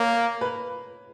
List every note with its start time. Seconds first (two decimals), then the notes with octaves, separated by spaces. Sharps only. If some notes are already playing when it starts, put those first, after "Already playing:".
Already playing: A#3 C#5
0.41 B4